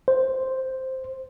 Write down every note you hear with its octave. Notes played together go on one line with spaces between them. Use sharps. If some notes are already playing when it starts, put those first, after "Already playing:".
C5